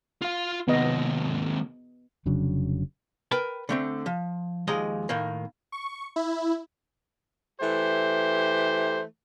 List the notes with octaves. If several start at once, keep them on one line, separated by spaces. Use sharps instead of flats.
F4 F5
D#2 C3 B3 D#5
F1 C#3 F#3 D4
A#4 B4 G5 A5
D3 A3 C4
F3
D#2 F3 G#3 D#5 A#5
A2 D#3 A#3
C#6
E4
E3 A3 G4 C5